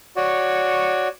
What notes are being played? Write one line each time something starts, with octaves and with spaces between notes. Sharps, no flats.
F#4 C#5 D5